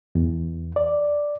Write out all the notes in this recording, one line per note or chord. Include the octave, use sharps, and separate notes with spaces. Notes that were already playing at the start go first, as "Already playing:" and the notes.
E2
D5